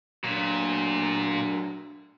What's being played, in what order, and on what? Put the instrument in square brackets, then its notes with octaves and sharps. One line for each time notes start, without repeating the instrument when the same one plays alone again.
[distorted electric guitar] A#2 [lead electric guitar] F#3 D4